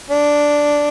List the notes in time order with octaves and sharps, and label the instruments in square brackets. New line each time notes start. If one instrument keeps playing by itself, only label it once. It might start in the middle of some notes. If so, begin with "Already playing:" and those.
[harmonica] D4